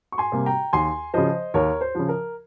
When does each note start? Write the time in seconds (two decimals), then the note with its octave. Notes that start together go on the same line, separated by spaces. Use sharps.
0.12 C#6
0.18 G#5 C6
0.32 C3 G3 A#3
0.46 G5 A#5
0.73 D#2 G#5 C6
1.14 C#3 F3 C5 D#5
1.54 D#2 A#4 C#5
1.81 C5
1.95 C#3 F3
2.09 A#4